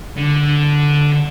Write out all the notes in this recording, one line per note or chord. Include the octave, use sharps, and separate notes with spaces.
D3